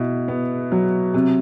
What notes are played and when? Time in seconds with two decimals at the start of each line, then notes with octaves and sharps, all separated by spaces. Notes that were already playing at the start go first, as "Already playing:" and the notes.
Already playing: B2 E4
0.28 B3
0.72 F#3
1.14 C3